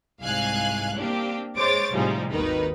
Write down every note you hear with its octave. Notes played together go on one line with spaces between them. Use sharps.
C2 G#2 F5 G#5 F#6
A#3 C4 D4 G4
G#3 C5 C#5 D6 A6
A2 C3 F3 G3 G#3 D#4
G#1 D#2 D#3 D#4 B4